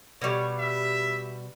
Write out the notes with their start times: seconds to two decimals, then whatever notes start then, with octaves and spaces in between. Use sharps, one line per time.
0.22 B2 G3 C#5
0.58 E5